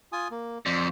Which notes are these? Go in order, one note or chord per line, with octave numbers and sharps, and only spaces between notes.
F4 G#5 D#6
A#3
F2 C5 D5